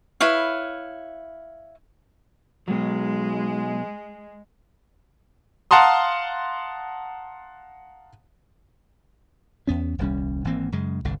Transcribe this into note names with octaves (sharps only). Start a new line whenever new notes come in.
E4 B4 C#5 F5
B2 F#3 G#3
F5 F#5 A5 A#5 C6 D#6
E2 B3 C#4
D#1 C2 G3 C#4
G#1 E3 A#3 C4
F#2 C#3 G#3
G1 C2 D3